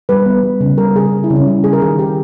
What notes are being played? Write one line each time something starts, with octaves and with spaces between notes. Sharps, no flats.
G3 B4
B3
G3
C#3
G3 A#4
C#3 G#4
C#3
E4
C#3
C#4
G3 E4
C#3 G#4
A#4
D#3 G#4
D#3 G4